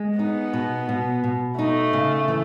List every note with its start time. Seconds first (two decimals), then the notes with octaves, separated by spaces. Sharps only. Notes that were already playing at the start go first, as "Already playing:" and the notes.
Already playing: G#3
0.18 B3 D#4
0.53 B2
0.89 B2
1.24 B2
1.58 A3 D#4
1.93 C#3
2.28 E3